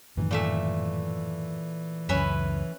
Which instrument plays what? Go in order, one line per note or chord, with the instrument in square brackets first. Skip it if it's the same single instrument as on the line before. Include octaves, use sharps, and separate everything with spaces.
[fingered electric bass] F#2 A2 D#3 [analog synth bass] E3
[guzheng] A#2 A3 E5
[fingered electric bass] C#2 F#2 [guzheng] C#4 B4 E5